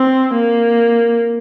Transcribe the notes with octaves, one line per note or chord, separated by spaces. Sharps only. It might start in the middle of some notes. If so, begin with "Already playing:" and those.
Already playing: C4
A#3